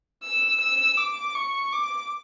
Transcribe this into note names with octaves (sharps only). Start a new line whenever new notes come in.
E6
E6
D6
C#6
D6